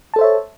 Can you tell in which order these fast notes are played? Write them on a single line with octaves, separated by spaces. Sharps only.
A5 A4 C5 E5 C#5